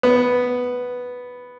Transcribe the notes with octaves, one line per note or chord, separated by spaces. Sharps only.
B3